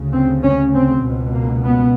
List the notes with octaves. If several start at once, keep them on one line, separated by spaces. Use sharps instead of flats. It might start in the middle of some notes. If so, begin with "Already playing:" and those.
Already playing: D2 C#3
C4
C#4
C4
C#2 B2
A#3
B3